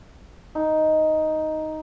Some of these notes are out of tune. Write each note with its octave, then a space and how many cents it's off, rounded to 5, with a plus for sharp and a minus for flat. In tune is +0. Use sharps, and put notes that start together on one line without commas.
D#4 +5